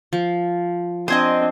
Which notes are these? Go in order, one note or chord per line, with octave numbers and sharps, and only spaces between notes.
F3
C4 D4 C5 D#5 G#5 D#6